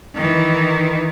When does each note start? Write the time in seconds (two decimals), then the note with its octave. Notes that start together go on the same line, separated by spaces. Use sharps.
0.15 D#3 E3